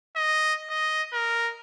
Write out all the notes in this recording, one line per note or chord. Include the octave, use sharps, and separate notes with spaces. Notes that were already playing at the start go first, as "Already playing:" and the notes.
D#5
D#5
A#4